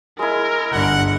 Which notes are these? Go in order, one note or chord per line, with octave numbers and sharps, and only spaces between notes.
G#3 E4 A#4
G1 D4 F#5